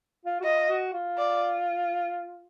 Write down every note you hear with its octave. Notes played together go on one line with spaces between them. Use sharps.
F4
F#4
F4 D#5
F#4
F4
D5